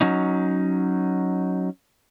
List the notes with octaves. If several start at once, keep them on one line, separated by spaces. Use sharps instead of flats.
F#3 C#4 D#4